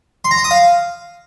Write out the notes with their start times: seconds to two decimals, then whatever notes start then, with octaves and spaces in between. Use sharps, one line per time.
0.25 C6
0.31 A#5
0.38 C6
0.44 D#6
0.51 F5